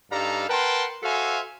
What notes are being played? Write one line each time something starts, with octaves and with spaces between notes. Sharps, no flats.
G2 G3 D#4 A4 F5 A#5
A#4 B4 F#5 G5 A5 C6
F#4 A4 C5 E5 F5 G#5